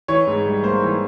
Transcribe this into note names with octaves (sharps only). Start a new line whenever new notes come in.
E3 C#5
G#2
G3
A#3 C5
E3